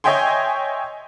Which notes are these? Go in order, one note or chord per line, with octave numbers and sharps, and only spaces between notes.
C#5 D#5 E5 G5 G#5 C6